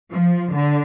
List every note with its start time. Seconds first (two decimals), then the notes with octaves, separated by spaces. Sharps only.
0.13 F3
0.54 D3